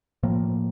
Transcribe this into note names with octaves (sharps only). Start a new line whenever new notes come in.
A2 F3 A#3